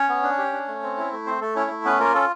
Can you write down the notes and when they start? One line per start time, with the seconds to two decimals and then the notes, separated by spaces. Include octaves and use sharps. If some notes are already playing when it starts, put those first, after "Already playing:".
Already playing: C#4 C#5
0.09 B3
0.23 D4
0.38 G4
0.52 D4
0.68 A3
0.83 C4
0.97 E4
1.12 A3
1.26 C4 C5
1.41 A3 A4
1.56 C#4 E4 C#5
1.71 A3
1.85 B3 C#4 B4
1.99 A#3 F4 A#4
2.14 C#4 A4